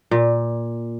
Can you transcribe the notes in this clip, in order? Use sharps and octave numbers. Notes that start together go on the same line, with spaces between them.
A#2